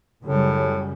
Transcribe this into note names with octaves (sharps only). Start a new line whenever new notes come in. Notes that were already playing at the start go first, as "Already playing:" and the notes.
F#2 A2 C#3 G3